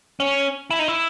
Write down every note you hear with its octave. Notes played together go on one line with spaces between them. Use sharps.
C#4
E4
D#4
E4